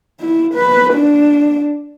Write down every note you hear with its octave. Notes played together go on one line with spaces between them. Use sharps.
E4
B4
D4